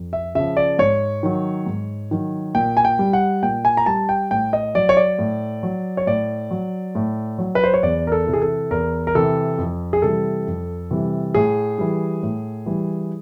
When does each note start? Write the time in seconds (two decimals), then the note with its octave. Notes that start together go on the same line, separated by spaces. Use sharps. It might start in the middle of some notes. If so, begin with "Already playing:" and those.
Already playing: F2
0.13 E5
0.35 C#3 F3 E5
0.57 D5
0.79 G#2 C#5
1.23 D#3 F#3
1.66 G#2
2.11 D#3 F#3
2.54 A#2 G5
2.77 G#5
2.85 G5
2.99 G3
3.13 F#5
3.43 A#2 G5
3.65 G#5
3.77 A#5
3.86 G3 A5
4.09 G5
4.31 A2 G5
4.53 D#5
4.75 F#3 D5
4.89 C#5
4.97 D5
5.19 A2
5.63 F#3
5.97 C#5
6.07 A2 D5
6.51 F#3
6.95 A2
7.38 F#3
7.55 B4
7.64 C5
7.74 C#5
7.83 E2 D5
8.07 A#4
8.12 A4
8.27 C3 E3
8.33 G#4
8.42 A4
8.71 E2 A#4
9.07 A#4
9.15 C3 E3 A4
9.58 F2
9.93 G#4
10.02 C3 E3 G3 A4
10.47 F2
10.91 C3 E3 G3
11.35 A2 G#4
11.78 E3 G3
12.23 A2
12.66 E3 G3